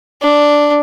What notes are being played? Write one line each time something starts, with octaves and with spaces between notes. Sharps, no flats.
D4